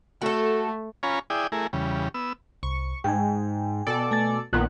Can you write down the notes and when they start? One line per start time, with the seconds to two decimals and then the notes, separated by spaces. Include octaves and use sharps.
0.22 A3 F#4 A4
1.03 C#4 F4 C#5 G#5 A#5 B5
1.30 E4 G#4 D5 G5 D#6
1.52 A3 E4 G#4 A#4
1.73 E2 C#3 G3
2.14 B3 E6
2.63 C2 C#6
3.04 G#2 G5 G#5
3.87 B2 A4 D5
4.11 A3 G#5 A6
4.53 A#1 A#2 D#3 B3 F#6